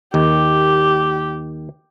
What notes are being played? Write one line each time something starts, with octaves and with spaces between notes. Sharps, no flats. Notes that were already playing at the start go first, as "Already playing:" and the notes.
D#2 D#3 G4